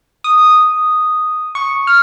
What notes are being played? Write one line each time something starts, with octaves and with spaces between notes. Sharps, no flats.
D#6
C#6
F6